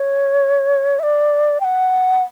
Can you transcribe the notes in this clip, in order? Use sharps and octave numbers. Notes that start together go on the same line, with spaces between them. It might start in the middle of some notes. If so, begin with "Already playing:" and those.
Already playing: C#5
E5
D5
G5
F#5